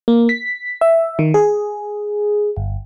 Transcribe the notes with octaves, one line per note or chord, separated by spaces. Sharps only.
A#3
B6
E5
D#3
G#4
G1